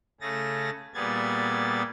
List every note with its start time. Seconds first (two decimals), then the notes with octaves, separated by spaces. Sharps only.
0.21 C#3 A3 G#4 A6 A#6
0.94 A#2 G3 B3 G#4 G#6 A6